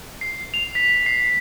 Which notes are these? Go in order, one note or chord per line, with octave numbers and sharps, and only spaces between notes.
C7
F7
B6
C7